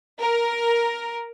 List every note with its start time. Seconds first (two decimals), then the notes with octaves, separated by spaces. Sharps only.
0.19 A#4